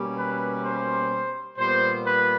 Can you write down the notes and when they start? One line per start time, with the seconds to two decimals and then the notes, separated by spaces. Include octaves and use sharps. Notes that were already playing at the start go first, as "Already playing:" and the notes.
Already playing: B2 G3 A#3 C#4
0.16 B4
0.63 C5
1.58 A#2 G3 B3 C5
2.05 B4